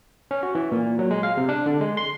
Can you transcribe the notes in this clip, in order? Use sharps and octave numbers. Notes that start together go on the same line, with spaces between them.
C#4
F#4
E3
A#2
F#3
G#3
F5
C3
D4
D3
G#3
C6